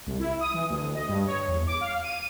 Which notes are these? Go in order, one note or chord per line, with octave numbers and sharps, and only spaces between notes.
C2
E4
D#6
E3
D2
D#5
G2
C#5
E2
D6
F5
D#7